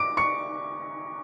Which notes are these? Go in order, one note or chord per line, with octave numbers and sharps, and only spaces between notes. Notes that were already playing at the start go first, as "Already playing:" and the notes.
Already playing: D6 D7
C#6 C#7